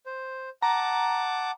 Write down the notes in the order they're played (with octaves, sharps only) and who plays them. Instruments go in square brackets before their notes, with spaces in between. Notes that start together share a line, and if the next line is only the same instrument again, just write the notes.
[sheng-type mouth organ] C5
[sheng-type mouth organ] F#5 A5 D6 [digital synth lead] A#5